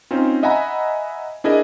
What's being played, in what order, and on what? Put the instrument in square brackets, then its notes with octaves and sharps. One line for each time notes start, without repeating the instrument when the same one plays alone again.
[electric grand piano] C4 C#4 D#4 F4 C5
D#5 E5 F#5 G#5 A#5 B5
D4 E4 G#4 A#4 D#5